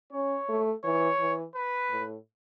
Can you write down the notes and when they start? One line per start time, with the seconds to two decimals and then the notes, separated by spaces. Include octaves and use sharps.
0.13 C#4 C#5
0.49 A3
0.84 E3 C#5
1.20 E3
1.55 B4
1.91 A2